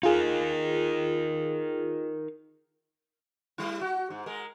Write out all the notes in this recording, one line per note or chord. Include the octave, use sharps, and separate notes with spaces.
D#4 F4 G#4 A#4 F5
G3 E4
F#4
G#2
G#3 A#4